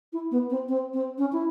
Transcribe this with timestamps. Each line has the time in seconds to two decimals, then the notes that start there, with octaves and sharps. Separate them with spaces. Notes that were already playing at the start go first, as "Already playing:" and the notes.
0.13 E4
0.31 B3
0.50 C4
0.69 C4
0.93 C4
1.18 C#4
1.32 E4